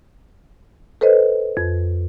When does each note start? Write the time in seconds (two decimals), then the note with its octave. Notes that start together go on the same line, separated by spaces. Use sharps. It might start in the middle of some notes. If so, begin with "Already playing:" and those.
1.01 A4 B4 C5 D#5
1.57 F2